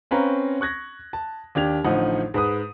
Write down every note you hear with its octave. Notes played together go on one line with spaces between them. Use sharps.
C4 C#4 B4 F5 A#5
C#6 F#6 G#6 A#6
A5
D#2 D4 G4 G#6 F7
A1 A2 D3 F3 D#4 F#5
G#2 B4 D#6